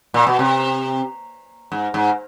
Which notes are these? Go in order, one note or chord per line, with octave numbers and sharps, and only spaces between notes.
A#2
B2
C3
G#2
G#2